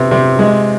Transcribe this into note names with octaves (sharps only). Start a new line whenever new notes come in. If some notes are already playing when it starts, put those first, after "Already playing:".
Already playing: C3 B3
C3
G#3